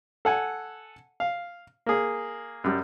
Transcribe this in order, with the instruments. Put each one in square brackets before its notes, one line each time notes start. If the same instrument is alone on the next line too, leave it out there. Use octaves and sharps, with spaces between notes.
[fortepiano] A4 F#5 G#5
F5
A#3 G#4
F#2 G3